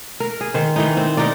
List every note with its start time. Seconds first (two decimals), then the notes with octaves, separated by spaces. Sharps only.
0.20 A#4
0.41 G#4
0.54 D#3 C5
0.76 D#3 E3 D#4
0.97 C4
1.17 D#4 G4 A#4 D5